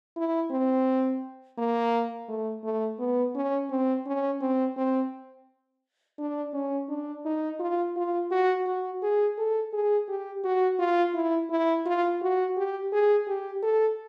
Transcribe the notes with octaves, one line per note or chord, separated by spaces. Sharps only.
E4
C4
A#3
A3
A3
B3
C#4
C4
C#4
C4
C4
D4
C#4
D4
D#4
F4
F4
F#4
F#4
G#4
A4
G#4
G4
F#4
F4
E4
E4
F4
F#4
G4
G#4
G4
A4